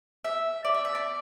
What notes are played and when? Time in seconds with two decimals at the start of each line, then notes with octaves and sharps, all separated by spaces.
0.24 E5
0.65 D5
0.74 E5
0.85 E5
0.95 D5